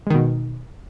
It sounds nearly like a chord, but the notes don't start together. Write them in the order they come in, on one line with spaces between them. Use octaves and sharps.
G#3 D#3 B2